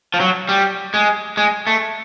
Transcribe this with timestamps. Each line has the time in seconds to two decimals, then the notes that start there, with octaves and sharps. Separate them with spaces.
0.14 F3
0.20 F#3
0.49 G3
0.94 G#3
1.37 G#3
1.67 A3